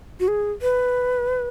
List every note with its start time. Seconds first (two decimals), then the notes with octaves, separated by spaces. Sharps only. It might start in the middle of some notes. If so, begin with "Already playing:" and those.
0.20 F#4
0.28 G#4
0.62 B4